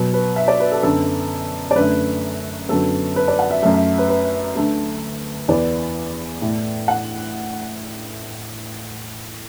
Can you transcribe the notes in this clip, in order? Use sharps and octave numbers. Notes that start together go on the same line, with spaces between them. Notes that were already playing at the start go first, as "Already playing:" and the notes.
Already playing: B2 F#3 B3
B4
E5
D5
B4
A4
F#2 D3 B3 A4
D5
F#2 D3 A3 B4
F#2 D3 F#3 B3 A4
B4
D5
F#5
E5
F#2 F#3 A3 E5
E5
B4
B4
D2 D3 A3
E2 E3 B3 D5
A2 A3
F#5